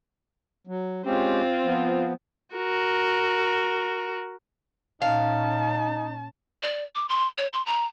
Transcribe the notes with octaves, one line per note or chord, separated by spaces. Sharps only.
F#3
G#3 C4 C#4 F4 G4
F3 B3
F#4 A#4
A#2 C#4 D#4 F5 A5
D5
D6
C6
C#5
C6
A#5